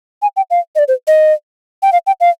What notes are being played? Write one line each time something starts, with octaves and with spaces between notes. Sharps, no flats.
G#5
G5
F5
D#5
D5
C5
D#5
G5
F5
G5
F5